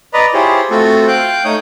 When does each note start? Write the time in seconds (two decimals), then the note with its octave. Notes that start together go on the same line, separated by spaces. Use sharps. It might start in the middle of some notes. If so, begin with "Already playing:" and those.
0.14 B4 D5 D#5 A#5 B5
0.34 E4 F4 G4 G#4 C5 C#5
0.70 A3 C4 F4 F#4 A4
1.08 F5 G5 F#6 G6
1.44 A3 D#4 C#5 D#6 G6